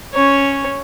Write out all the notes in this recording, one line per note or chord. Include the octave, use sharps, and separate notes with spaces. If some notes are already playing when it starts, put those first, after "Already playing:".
C#4 C#5